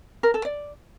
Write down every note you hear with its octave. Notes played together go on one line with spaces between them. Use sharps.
A#4
A4
D5